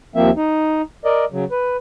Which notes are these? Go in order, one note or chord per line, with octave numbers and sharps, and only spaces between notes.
D#2 F3 A#3 C4 E5
D#4
A#4 D5 D#5
C#3 F#3
B4